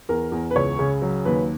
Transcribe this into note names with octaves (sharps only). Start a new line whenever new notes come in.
E2 A#4
E2
B4
C#2 C#5
C#3
F#3
D#2 B4